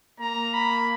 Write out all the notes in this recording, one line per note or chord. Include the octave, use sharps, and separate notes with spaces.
A#3 A#5
B5